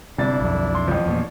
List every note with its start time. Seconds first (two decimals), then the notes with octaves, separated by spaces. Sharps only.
0.18 G1 C3 D4 E4 D5 A6
0.41 B1 F2
0.75 C6
0.88 A1 F3
1.06 E2 A#2 C#5 D5